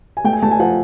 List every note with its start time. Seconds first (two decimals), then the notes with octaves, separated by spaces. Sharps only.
0.17 G#5
0.24 A3 G5
0.33 G#5
0.42 A3 A5
0.51 G#5
0.60 F3 F#5